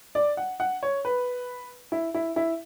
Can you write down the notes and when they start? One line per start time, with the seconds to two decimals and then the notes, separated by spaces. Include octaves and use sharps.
0.15 D5
0.37 F#5
0.60 F#5
0.83 C#5
1.05 B4
1.92 E4
2.14 E4
2.36 E4